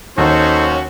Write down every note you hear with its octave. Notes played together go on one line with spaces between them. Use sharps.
D#2 D#3 C#4 D#4 F#4 A4 C5